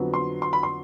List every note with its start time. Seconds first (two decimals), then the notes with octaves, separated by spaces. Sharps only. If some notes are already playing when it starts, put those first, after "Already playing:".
Already playing: F2 D3 F#3 B3
0.14 C6
0.42 C6
0.53 B5
0.63 C6